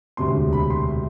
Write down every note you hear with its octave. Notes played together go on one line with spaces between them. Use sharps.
E1 D2 C3 F#3 C6
B5
C6